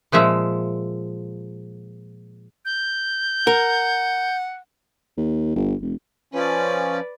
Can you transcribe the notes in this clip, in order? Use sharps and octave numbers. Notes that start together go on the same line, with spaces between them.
A#2 F3 G#3 E5
G6
A#4 F#5
D#2
G1
F1
F3 C#4 B4 D5